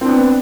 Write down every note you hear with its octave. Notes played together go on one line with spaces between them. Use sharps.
B3 C4 D4